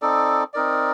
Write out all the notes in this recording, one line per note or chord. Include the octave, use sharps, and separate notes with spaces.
C4 D#4 A4 D5
C4 D#4 A#4 D5